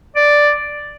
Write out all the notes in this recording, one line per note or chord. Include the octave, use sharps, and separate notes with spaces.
D5